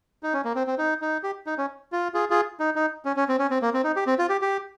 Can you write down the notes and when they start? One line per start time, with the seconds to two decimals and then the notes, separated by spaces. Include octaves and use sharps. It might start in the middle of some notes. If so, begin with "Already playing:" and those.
0.23 D#4
0.33 C#4
0.45 A#3
0.56 C4
0.67 C4
0.78 D#4
1.02 D#4
1.23 G4
1.47 D#4
1.58 C#4
1.92 F4
2.14 F4 G#4
2.30 F4 G#4
2.60 D#4
2.76 D#4
3.05 C#4
3.16 C#4
3.28 C4
3.39 C#4
3.51 C4
3.62 A#3
3.74 C4
3.84 D#4
3.96 G4
4.07 C4
4.19 F4
4.29 G4
4.41 G4